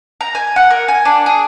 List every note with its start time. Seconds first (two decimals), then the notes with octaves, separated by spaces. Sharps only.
0.21 A#5
0.35 G#5
0.56 F#5
0.71 A#4
0.88 G#5
1.05 D4
1.26 G#4